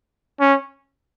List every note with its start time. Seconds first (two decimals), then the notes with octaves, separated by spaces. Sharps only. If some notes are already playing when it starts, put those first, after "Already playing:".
0.40 C#4